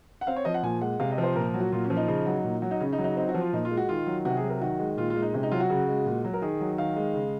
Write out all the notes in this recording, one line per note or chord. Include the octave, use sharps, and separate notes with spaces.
F#5
C4 F5
C#5
F3 D#5
F#5
A#2 G#5
G#3 F#5
C3 F5
D#5
F3
C5
A#2 A#4
F#3
F#4
A#2 F4
C#4
F3
D#4
C#3
F#3
A#2
F#3
D#4
C#3 C#4
D#4
F#3
D#4
C4 D#4
F#4
F3
F4
A#2 D#4
F4
G#3
F#4
D#3 F4
F#3
C3 F#4
G#4
F#3
A#4
D#3 F#4
G#3
A#2 F4
F4
G#3
D#4
C3 C#4
D#4
F#3 F4
F#4
C#3
G#3
A#2
F#3
A#4
D#3 G#4
F#3
D#3 F5
G#3
C#3